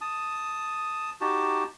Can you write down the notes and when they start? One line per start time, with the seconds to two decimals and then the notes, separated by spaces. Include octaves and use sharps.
0.01 A5 D#6
1.21 D#4 F#4 G4 A5